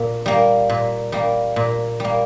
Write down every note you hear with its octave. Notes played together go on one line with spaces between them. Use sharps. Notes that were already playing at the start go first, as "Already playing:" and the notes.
Already playing: A#2
G3 A#3
A#2
G3 A#3
A#2
G3 A#3